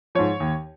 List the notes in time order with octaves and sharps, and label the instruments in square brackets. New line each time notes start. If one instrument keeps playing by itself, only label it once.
[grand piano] G#2 F3 C#5
D#2